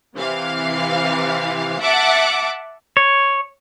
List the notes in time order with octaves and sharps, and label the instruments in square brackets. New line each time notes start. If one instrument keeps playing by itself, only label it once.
[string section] C3 E3 F5
E5 F#5 A5 D6
[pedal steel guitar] C#5